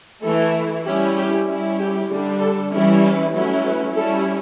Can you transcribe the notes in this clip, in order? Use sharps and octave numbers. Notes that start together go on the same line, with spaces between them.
E3 A3 E4 A4
G3 C#4 E4 G4
G4
G3 C#4 E4
G4
D3 G3 D4
A4
E3 G3 C#4 E4
B4
F#3 A3 C#4 E4
B4
G3 C#4 E4 A4